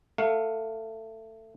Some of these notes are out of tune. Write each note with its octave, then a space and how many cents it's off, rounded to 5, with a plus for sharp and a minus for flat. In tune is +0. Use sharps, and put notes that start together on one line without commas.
A3 +20 F5 +20